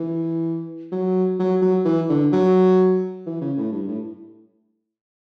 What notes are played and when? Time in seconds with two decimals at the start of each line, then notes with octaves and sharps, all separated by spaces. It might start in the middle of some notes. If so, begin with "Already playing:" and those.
Already playing: E3
0.92 F#3
1.39 F#3
1.62 F#3
1.85 E3
2.10 D3
2.32 F#3
3.26 E3
3.41 C#3
3.57 A2
3.72 G2
3.88 A2